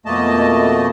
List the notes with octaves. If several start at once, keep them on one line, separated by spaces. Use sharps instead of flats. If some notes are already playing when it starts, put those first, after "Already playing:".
F2 B2 A3 A#3 D#5 A5